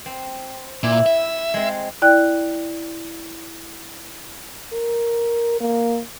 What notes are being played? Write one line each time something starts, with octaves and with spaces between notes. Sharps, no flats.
C4
A#2 E4
E5
G#3 C4
E4 D5 G5 F#6
A#4
A#3